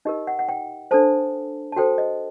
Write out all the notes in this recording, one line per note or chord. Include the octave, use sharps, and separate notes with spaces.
D#4 G4 A#4 D#5
F#5
F#5
G5
D4 A4 C5 A5
A5
F#4 A4 C5 G5
D#5